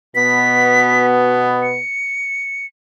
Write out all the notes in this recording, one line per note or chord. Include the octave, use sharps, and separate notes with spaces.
B2 B3 B6
C#7